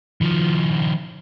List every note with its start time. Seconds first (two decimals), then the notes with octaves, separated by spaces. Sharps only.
0.21 D#3 F3